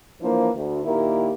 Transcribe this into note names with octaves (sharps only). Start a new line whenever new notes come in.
E3 F3 A#3 D4 E4 C5
D2
A#2 D#3 A#3 E4 G4 A#4